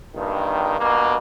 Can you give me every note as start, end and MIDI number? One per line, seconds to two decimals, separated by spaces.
0.15 0.76 34
0.15 0.76 43
0.15 0.76 51
0.78 1.15 43
0.78 1.15 47
0.78 1.15 58